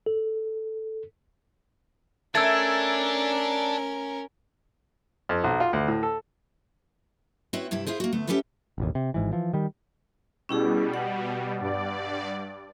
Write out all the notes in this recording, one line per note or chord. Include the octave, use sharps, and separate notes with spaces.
A4
A3 C#4 D4 A#4 E5 E6 G#6 A6
F2
B1
F4
D2
A2
A4
C4 E4 F#4 B4 C#5
G2 C3 E4 G4
E4 F4 G#4 C5
A#3 F#4
D2 A3 B3
C#4 G4 A4 B4 E5 F#5
E1 A1 D#2
C3
G#1 G#2 E3
E3 F3
D#3 G3
B2 G3 C#4 E4 G#4
F#5
G2 D5